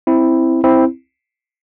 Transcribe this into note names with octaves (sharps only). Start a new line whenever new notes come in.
C4 E4
C4 E4